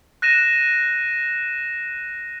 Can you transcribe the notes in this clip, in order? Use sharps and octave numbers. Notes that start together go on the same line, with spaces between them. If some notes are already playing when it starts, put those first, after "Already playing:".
F#6 A#6 D#7 E7